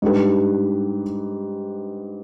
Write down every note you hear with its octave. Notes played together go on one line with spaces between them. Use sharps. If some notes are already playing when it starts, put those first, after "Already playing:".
G#2 G3 D4 G4 B4